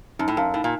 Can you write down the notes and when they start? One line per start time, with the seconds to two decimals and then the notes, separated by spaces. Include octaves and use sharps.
0.19 F#2 D#4
0.28 A2
0.37 F#2 A#4 F5 A5
0.54 A2 D#4
0.64 A#2